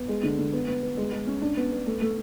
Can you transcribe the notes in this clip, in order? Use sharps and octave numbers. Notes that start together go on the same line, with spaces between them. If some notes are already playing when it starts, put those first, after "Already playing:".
Already playing: B3
G#3
D3
D3
B3
B3
B3
G#3
G#3
C#4
D4
B3
B3
A3
A3